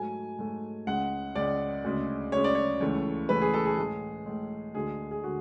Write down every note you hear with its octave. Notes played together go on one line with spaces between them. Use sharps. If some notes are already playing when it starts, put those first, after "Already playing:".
Already playing: G#2 F#3 A3 G#5
G#2 F#3 A3
C#2 C#3 G#3 F#5
C#2 C#3 G#3 D5
D2 C#3 G#3
D2 C#3 G#3 C#5
D5
C#5
C#2 C#3 E3 A3
C#2 C#3 E3 A3 B4
G#4
A4
G#4
A2 G#3 G#4
A2 G#3
D2 D3 G#3 G#4
G#4
D3 G#3 F#4